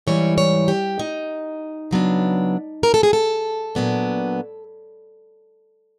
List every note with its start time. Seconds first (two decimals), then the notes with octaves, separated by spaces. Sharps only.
0.07 G#2 E3 G3 C#5
0.38 C#5
0.68 G4
0.99 D#4
1.91 C#3 F#3 B3 D4
2.83 A#4
2.94 A4
3.03 G#4
3.13 A4
3.75 A#2 F#3 B3 D4